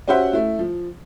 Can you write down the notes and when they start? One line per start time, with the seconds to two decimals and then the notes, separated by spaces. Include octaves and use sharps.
0.08 C#4 F#4 G4 C5 E5 F#5
0.33 A3 E4
0.59 F3